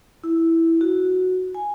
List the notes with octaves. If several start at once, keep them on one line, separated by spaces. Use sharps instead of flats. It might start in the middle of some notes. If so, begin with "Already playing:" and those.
E4
F#4
G#5